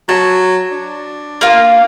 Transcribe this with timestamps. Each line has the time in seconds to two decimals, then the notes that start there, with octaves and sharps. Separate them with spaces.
0.09 F#3 A5
0.71 D4
1.41 A#3 F4